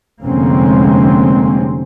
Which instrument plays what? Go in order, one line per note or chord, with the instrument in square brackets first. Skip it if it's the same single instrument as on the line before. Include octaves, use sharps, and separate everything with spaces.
[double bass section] F1 D3 G#3 A#3 C4 C#4